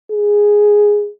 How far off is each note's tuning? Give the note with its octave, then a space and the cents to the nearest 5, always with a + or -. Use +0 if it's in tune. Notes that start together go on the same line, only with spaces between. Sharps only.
G#4 -5